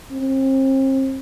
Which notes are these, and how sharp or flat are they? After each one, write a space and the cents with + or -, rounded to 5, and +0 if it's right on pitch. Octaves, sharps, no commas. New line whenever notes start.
C4 +35